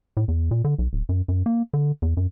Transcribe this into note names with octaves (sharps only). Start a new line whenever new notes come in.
A2
E2
A#2
D3
B1
D1
F#2
F#2
A#3
D3
E2
F#2